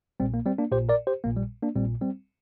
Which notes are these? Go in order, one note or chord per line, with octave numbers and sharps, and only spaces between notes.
A#1 A#2 G3 C4
A#3
G3 C4
A#3 D4
A#1 A#2 G4 C5
A#4 D5
G4 C5
A#1 A#2 A#3
G3
A#3 D4
A#1 A#2 G3 C4
G3 C4